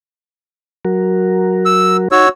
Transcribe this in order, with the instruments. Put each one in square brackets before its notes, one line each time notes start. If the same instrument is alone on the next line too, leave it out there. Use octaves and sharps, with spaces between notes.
[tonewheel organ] F#3 F#4 A#4
[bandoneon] E6
[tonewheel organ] D#4 [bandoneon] F#4 C#5 E6